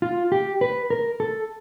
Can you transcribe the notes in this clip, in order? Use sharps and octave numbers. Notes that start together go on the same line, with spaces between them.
F4
G4
B4
A#4
A4